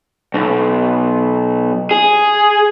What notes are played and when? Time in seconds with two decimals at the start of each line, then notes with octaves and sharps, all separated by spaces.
0.34 B1
1.91 G#4